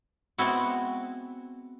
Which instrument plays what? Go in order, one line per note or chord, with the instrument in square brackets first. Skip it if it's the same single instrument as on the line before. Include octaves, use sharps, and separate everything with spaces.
[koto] G#3 B3 C4 E4 F#4